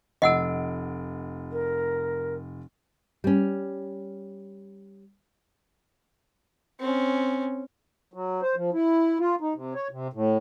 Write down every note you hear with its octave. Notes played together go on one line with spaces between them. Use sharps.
F1 D#5 F#5 E6 D7
A#4
G3 C#4
C4 C#4
F#3
C5
F3
E4
F4
D#4
C3
C#5
C3
A2